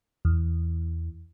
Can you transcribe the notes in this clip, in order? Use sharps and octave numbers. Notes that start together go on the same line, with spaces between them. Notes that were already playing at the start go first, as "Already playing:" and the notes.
E2